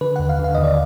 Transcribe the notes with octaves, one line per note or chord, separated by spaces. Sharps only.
D3 B4
D#2 F#5
F5
D3 F5
D#2 D#5
D5